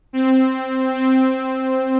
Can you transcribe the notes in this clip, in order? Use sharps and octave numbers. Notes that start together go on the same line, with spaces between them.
C4
C4